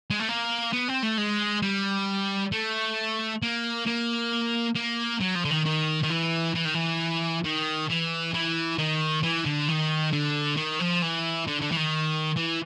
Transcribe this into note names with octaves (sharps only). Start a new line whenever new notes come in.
G#3
A3
A#3
B3
C4
A3
G#3
G3
A3
A#3
A#3
A#3
F#3
F3
D3
D#3
D#3
D#3
E3
E3
D#3
E3
D#3
E3
E3
D#3
E3
D3
D#3
D3
D#3
F3
E3
D3
D3
E3
D#3
E3